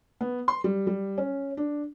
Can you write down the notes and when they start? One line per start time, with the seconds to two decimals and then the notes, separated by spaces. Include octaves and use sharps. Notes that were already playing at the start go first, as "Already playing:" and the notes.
0.21 B3
0.48 C6
0.64 G3
0.87 G3
1.18 C#4
1.57 D4